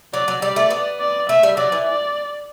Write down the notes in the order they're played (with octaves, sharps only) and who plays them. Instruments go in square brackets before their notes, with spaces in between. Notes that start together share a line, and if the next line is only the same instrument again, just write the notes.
[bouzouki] F#3 [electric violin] D5
[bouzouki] F#3
[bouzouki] G3 [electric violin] D5
[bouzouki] A3
B3
[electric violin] D5
[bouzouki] A3 [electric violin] E5
[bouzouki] G3
[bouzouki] F#3 [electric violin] D5
[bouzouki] E3
[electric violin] D5